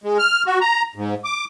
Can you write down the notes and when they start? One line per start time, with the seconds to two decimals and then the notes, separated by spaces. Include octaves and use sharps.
0.04 G#3
0.19 F6
0.46 F#4
0.61 A#5
0.96 G#2
1.24 D6